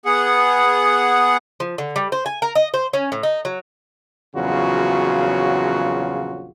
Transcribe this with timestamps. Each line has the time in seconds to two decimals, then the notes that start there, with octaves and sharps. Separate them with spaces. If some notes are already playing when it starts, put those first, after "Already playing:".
0.06 B3 G#4 F#5
1.60 F3
1.78 D3
1.96 G3
2.12 C5
2.26 G#5
2.42 A#4
2.55 D#5
2.74 C5
2.93 C#4
3.12 A2
3.23 D#4
3.45 F#3
4.34 A#1 E2 C#3 F#3 F4 F#4